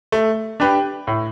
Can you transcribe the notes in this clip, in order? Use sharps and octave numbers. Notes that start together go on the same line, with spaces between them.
A3
D4 G4 B4
A2